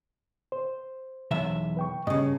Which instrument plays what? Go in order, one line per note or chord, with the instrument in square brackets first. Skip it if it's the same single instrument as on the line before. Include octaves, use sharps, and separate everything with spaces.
[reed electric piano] C5
[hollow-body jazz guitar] B1 E2 E5
[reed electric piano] B4 G5 C#6
[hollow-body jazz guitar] G2 C#3 [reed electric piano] D#5